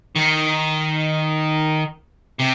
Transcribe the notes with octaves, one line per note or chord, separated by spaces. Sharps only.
D#3
C3